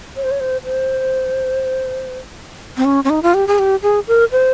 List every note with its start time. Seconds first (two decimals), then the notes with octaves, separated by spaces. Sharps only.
0.16 C#5
0.24 C5
0.31 C#5
0.40 C5
0.65 C5
2.77 C4
2.85 C#4
3.04 C#4
3.10 D#4
3.23 F4
3.34 G4
3.47 G#4
3.59 G4
3.83 G#4
4.08 A#4
4.32 C5